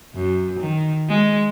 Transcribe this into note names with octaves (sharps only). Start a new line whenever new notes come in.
F#2
D#3
G#3